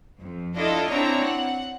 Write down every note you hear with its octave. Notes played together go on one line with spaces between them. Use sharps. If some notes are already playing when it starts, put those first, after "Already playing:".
F2
D4 E4 F4 A4 D#5
C4 D4 E4 C#5 A#5
F#5